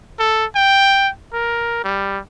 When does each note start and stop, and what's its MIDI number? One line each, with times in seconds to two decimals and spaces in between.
0.19 0.45 69
0.56 1.10 79
1.33 1.81 70
1.84 2.20 55